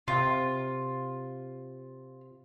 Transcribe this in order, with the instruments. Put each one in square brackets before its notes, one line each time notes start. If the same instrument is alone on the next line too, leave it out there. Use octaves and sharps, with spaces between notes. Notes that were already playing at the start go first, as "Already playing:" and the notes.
[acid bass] C3 [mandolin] F4